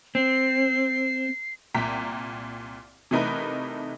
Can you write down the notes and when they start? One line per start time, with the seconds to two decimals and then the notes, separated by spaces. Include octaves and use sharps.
0.15 C4 C7
1.74 C2 A#2 G5 A#5 B6
3.11 C3 E3 A3 D#4 A#4 B4